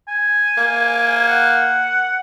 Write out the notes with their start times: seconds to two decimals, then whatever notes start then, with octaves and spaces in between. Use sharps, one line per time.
0.08 G#5
0.57 A#3
1.28 F#5